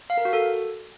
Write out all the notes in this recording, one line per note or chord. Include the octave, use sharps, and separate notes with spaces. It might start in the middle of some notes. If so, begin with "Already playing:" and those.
F5
A#4
F#4
A4